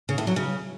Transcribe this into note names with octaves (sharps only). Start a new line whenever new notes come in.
C#3
A2
F#3
C#3